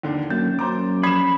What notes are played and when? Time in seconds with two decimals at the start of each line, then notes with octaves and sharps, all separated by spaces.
0.03 D#2 D3
0.30 F#2 A#3 A6
0.59 F#2 C5 A#5 D6
1.03 F3 B5 G#6 E7